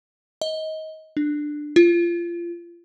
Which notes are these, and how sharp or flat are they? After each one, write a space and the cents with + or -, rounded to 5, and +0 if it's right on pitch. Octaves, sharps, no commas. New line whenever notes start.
D#5 +25
D4 +15
F4 -25